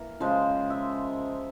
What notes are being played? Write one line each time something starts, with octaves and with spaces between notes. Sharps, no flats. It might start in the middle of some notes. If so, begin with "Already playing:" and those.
Already playing: E3 A#3 A#4
C#3 F3 G#3 C5
E5